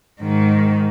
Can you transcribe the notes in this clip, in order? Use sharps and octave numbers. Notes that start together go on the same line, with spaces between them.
G#2 D#3